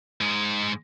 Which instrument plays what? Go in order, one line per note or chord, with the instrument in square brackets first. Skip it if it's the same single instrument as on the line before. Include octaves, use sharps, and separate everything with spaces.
[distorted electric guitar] G#2 G#3